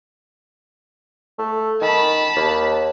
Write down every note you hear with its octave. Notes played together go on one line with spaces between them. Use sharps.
A3
D#3 A5 B5
D#2